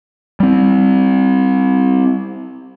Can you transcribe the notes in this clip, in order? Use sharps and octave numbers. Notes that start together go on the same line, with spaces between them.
G3 C4